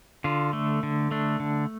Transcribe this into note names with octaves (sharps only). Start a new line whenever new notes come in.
D3 F4
A3
D3
A3 D4
D3